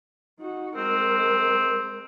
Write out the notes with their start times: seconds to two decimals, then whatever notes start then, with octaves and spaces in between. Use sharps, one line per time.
0.39 D#4 F#4
0.76 G#3 C4 A#4